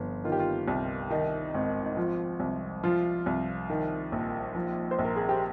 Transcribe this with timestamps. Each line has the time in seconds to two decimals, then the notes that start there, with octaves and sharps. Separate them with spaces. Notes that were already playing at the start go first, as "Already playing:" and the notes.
Already playing: G1 F3
0.25 D#3 F4
0.32 G4
0.39 F4
0.68 C2
1.10 D#3 D#4
1.54 G#1
1.86 D#4
1.97 F3 F4
2.40 C2
2.84 F3 F4
3.26 C2
3.70 D#3
4.12 A#1
4.55 F3
4.91 C5
4.99 A#1
5.04 A#4
5.16 G#4
5.29 G4